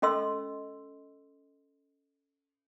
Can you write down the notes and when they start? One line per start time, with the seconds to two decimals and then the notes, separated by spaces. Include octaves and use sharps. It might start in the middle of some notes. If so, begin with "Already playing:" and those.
0.02 C#4 A4 D#5 C6 E6